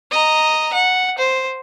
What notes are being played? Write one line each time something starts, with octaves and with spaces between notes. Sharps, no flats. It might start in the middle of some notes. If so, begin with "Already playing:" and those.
D#5 A#5
F#5
C5